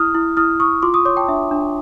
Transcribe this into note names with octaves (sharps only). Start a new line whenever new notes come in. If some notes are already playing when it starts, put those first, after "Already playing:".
Already playing: E4 D#6 F6
E4
E4 D#6 F6
E4 C#6 D#6
F4 C6 D6
C#6 D#6
C#5 C6 D6
G5 A5
D4 E5
D4